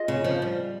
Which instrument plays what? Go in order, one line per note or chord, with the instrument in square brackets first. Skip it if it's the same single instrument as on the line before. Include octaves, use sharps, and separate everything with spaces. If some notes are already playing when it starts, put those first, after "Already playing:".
Already playing: [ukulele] F4 G#4 D#5
[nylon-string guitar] C#3
F3
G3